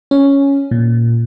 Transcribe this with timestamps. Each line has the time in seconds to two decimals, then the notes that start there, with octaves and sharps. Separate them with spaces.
0.11 C#4
0.71 A#2